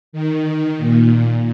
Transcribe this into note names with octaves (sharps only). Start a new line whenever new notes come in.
D#3
A#2